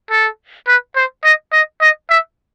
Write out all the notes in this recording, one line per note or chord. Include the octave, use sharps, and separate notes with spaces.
A4
B4
C5
D#5
D#5
D#5
E5